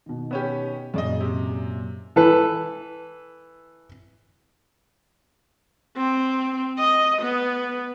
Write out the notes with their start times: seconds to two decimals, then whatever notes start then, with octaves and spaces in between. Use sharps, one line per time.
0.06 B2 D#3
0.31 B3 C#4 G4
0.94 F#2 A#2 C#3 D5 D#5
1.20 C3
2.16 E3 A4 B4
5.97 C4
6.79 D#5
7.22 B3